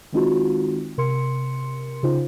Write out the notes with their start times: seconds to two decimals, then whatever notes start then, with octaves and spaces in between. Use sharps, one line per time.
0.13 D#3 G#3 C4 D#4 F4 F#4
0.98 C3 A#4 C6 C#7
2.03 C#3 D#4 F4 C5